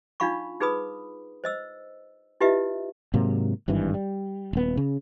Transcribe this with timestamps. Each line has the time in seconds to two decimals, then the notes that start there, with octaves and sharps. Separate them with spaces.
0.20 D4 D#4 F4 F5 B5 C#6
0.60 D#4 G#4 B4 B5 D#6
1.44 C5 D#5 E6
2.41 E4 F4 G4 B4 D#5 E5
3.14 G#2 C3 F#3 A#3
3.68 G#1 G2 D#3 E3
3.94 G3
4.53 D#1 B3
4.77 C#3